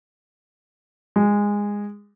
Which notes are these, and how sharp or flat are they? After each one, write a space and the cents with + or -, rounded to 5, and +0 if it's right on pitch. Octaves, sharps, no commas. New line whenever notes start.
G#3 -15